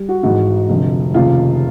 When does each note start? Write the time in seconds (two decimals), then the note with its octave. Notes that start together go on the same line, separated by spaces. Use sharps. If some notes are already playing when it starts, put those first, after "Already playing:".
Already playing: G3
0.09 F#4
0.23 G#1 G#2 E3 F#4
0.69 F1 F2 D3
1.14 F1 D#2 C#3 F4